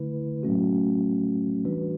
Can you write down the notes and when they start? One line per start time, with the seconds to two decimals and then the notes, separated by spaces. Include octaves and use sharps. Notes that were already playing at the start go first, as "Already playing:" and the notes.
Already playing: D3 A3 E4 B4
0.43 A2 F#3 A3 C#4 F#4
1.65 E3 G3 D4 F#4 B4